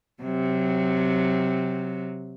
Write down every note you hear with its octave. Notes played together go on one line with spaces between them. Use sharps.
C3 F#3